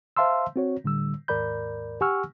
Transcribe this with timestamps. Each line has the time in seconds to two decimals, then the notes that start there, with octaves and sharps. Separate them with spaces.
0.17 C5 E5 F5 A5 C6 E6
0.56 C4 F#4 C#5
0.84 A2 D3 G3 E6
1.28 D#2 G#2 A#4 D5 B5 G6
2.01 G4 F#5 G#5 C#6 E6 F6